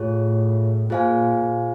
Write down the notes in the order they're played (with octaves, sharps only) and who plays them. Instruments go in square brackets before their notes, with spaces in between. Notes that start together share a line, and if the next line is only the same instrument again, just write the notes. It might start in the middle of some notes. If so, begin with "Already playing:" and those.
Already playing: [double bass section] A2 [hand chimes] F4 G#4 C#5
[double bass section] A#2 [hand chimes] F4 G#4 C5 F5 G#5